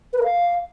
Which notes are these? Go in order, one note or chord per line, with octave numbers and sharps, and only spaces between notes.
B4
A#4
F5